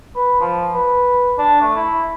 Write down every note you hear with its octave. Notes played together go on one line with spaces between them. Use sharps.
B4
F3
B4
D4
A3
E4